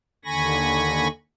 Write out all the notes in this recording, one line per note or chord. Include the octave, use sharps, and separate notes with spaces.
D#2 D3 G#5 B5 C#6 A#6